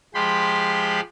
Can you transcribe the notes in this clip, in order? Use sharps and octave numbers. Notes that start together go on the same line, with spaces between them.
F3 G#3 G4 B5 C6